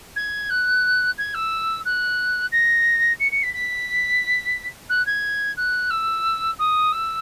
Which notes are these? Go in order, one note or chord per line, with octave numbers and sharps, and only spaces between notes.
G#6
F#6
G#6
E6
F#6
A#6
C#7
C#7
B6
B6
F#6
G#6
F#6
E6
D#6
E6